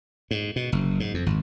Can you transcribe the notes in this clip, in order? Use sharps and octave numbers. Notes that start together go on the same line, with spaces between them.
G#2
B2
F#1
G#2
F2
G#1